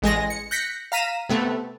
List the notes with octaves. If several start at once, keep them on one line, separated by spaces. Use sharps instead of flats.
A1 G#3 G#4 A#6
C#7
F#6 G6 A#6 B6 C#7
F5 A#5 B6 D#7 E7
C3 A3 B3